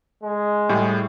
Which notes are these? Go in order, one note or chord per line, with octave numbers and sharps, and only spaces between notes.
G#3
A2 G3 G#4